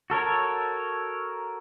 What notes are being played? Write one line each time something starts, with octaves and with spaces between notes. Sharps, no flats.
F#4 A4 A#4 C#5